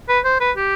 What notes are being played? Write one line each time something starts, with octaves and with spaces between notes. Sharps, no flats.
B4
C5
B4
G4